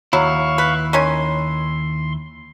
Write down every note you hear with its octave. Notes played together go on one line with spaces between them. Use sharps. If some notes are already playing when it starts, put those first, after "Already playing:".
D#2 F#3 E4 F5 C#6
B4
D#3 C#4 G#5 C6